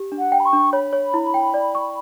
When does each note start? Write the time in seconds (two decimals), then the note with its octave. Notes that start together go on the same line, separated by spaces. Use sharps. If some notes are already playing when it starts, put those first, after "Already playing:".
Already playing: G4
0.12 D4
0.18 F#5
0.32 G5
0.39 B5
0.45 C#6
0.53 D4
0.72 C#5 B5
0.93 C#5
1.14 E4
1.34 G5
1.54 D5
1.75 C#6